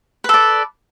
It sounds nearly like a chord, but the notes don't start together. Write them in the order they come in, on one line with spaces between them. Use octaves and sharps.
B4 A4 D5